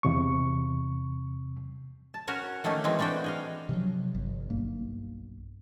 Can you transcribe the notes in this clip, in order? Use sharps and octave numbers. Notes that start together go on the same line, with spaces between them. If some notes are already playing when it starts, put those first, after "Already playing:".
E2 C3 C#6
A5
C#4 F#4 A#4 C#5
D#3 A3 A#3 C#4 D#4
E3 G#3 C4 E4
E3 A3 D4 F#4 G5
G#4 D#5 F5
C3 F3 F#3
G1
B1 G2 A#3